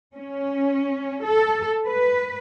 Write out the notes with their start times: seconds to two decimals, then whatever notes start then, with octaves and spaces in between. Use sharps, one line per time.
0.16 C#4
1.26 A4
1.86 B4